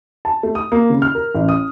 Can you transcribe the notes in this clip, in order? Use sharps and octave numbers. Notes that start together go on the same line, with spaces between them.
A5
A3
D#6
A#3
C#3
F6
A#4
A1
D#6